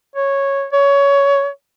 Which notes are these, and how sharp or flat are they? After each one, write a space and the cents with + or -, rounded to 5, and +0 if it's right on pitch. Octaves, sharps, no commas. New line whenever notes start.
C#5 -5
C#5 +20